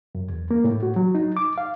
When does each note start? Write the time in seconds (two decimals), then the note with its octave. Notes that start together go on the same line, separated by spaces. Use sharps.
0.15 F#2
0.30 E2
0.51 A#3
0.64 A2
0.83 F#4
0.96 F#3
1.15 D#4
1.37 D6
1.58 F5